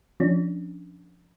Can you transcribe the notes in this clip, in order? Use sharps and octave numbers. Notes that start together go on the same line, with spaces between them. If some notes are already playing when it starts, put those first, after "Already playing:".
F3 C#4 D4